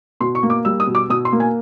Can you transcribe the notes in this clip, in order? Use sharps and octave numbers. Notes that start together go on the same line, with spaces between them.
B2 C6
C#6
A#3
D6
G3 E6
D#6
B2
D6
B2 D#6
C6
A#3
G#5